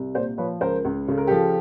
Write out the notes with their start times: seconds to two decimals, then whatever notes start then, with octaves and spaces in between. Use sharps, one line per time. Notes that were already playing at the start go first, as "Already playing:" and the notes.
Already playing: C2
0.14 A#2 C5 D5
0.38 F3 B4 C#5
0.61 C#2 A#4 C5
0.85 C#2
1.07 C#3 A4
1.18 A#4
1.27 F3 G4 A4